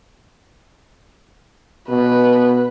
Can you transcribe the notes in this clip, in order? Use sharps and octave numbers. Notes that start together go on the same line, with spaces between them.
B2 B4